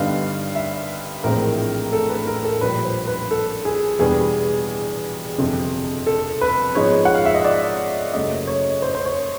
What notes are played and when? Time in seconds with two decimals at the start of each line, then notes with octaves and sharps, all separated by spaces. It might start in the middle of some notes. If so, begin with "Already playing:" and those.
Already playing: G2 D3 G3 B3 D#4 F5
0.55 E5
1.24 A#1 A2 E3 G#3 C4 A#4
1.93 A4
2.10 B4
2.27 A#4
2.45 A4
2.61 A#1 A#2 G3 B4
2.85 C5
3.07 B4
3.31 A4
3.65 G#4
3.99 E2 B2 G3 B3 D4 G#4
5.37 G1 F2 C3
6.07 A4
6.41 B4
6.75 G#2 F3 G#3 B3 D#4 C#5
7.05 F#5
7.15 F5
7.25 E5
7.35 D#5
7.44 D5
8.13 F#1 F#2 C#3 F#3 A3 D#5
8.47 C#5
8.82 C5
8.95 C5
9.05 C#5